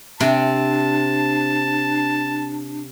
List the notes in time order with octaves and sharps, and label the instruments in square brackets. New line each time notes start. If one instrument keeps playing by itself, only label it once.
[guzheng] C3 C4 [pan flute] D4 [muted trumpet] A5